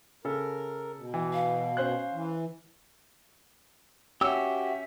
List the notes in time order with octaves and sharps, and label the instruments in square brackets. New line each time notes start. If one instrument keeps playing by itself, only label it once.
[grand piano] C#3 A4 [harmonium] A#4
[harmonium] B2
[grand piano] E3
[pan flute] F5
[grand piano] C#4 C5 F#6
[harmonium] E3
[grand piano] C#4 [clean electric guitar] F#4 G4 [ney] E5 [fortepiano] E6